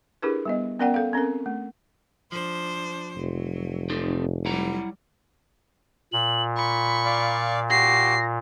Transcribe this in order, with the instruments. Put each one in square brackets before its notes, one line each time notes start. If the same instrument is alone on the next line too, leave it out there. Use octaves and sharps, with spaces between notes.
[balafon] D4 E4 G4 G#4 A#4 B4
G3 B3 D#5
B3 C#4 A#4 D5 F#5 G5
A4 F5
C4 C#4 A4 A#4
A3
[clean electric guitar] F3 [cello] D4 C5
[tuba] F1 [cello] F#3
[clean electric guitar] C4 D#4 A4
[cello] F#3 G3 [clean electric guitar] E4 F#5 A#5
[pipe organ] A#2 [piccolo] F#7
[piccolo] B5 [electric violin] C#6
[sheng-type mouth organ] D5 F5
[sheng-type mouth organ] F#4 G4 [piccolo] A#6 [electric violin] C7